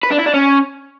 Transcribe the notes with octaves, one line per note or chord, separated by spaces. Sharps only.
B4
D4
E4
D4
C#4